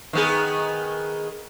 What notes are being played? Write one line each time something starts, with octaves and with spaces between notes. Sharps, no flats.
D#3 B3 G#4